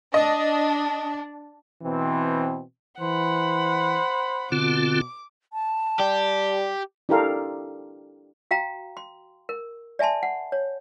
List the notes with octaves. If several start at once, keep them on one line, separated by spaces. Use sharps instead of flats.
D4 D#5
B2 E3 C4
E3 C5 F#5 B5
B2 D3 C4 F4 D6
A5
G3 G4
D4 E4 G4 A4 A#4 F5
F#4 F5 G5 A#5
C6
A#4
D5 E5 G#5 A5 C6
F#5
C#5